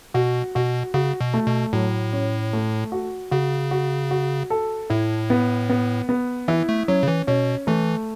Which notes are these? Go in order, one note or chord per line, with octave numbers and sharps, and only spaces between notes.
B2 F#4
B2 F#4
C#3 F#4
B2
A3
B2
A2 F#3
C#4
A3
F#4
C#3 F#4
F#4
F#4
A4
A2 E4
B3
B3
B3
E3 E4
A3
F#3 C#4
C#3
E3
B2 C#4
E3 A3